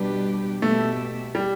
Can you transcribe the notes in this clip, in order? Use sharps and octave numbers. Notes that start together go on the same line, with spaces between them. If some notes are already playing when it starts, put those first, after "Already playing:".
Already playing: B2 G3 D4 G4 B4
B2 A3 B3 G4 E5
G3